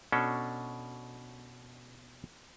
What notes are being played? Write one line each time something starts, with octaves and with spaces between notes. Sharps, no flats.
B2 C#4 D4 A4